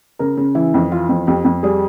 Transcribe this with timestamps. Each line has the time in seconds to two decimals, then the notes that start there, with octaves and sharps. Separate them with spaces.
0.19 C#3 A#4
0.37 C#3
0.55 E3 E4
0.74 F2
0.91 E3 F4
1.09 F2 F4
1.27 F2 G4
1.45 F2
1.63 G3 G#4